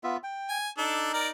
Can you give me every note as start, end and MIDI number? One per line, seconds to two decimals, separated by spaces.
0.04 0.17 59
0.04 0.17 65
0.04 0.17 76
0.23 0.58 79
0.49 0.68 80
0.78 1.12 62
0.78 1.31 63
0.78 1.12 69
1.13 1.28 70
1.13 1.28 74